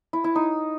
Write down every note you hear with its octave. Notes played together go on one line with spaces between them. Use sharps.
E4
E4
D#4